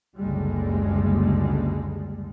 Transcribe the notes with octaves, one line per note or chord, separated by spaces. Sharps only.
F#1 C#2 A2 D3 G3 G#3